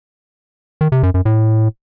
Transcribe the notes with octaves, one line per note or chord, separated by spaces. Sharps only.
D#3
C3
F#2
F#2
A2